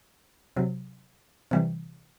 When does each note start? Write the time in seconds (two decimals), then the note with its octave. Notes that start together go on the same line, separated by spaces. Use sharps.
0.56 C3 F#3
1.51 C3 E3 G3